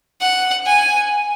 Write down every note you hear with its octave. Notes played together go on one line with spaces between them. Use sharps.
F#5
G#5